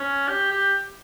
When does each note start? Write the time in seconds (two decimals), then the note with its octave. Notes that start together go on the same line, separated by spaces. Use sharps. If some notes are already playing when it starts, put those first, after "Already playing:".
Already playing: C#4
0.28 G4
0.51 G4